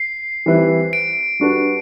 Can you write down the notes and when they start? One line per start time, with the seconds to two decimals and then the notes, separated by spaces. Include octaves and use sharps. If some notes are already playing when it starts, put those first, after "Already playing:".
Already playing: C7
0.46 E3 G3 C4 E4 B4
0.93 D7
1.40 G3 D4 F#4 B4